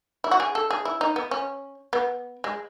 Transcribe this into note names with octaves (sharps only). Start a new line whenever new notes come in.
E4
F#4
G#4
A4
G#4
E4
D#4
B3
C#4
B3
G#3